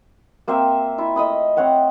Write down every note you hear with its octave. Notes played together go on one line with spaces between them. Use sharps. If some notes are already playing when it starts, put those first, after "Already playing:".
A#3 C4 C5 E5
E4 F4
A3 D#5 B5 D#6
C4 C#5 F#5 G5